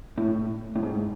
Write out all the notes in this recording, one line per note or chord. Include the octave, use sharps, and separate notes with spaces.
A2
A2
G#2